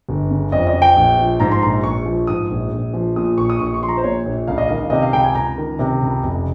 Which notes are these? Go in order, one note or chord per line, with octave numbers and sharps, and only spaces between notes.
G1
C#3
F2 D#5
D#5
F3
G5
A#1
F3
G#2 A#5
C6
A#1 A#5
A#1 C#6
F3
G#2 D#6
A#1
A#1
F3
A#2 D#6
A#1 C#6
D#6
A#1 C#6
C#6
F3 C6
A#5
C5
A#2 C#5
A#1
C#2 F5
D#5
D#3 F5
C3 D#5
F5
C#2 G5
G#5
C#2 A#5
D#3
C3
C#2
F1